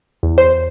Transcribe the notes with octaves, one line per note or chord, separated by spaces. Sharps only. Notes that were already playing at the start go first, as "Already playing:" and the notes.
E2
C5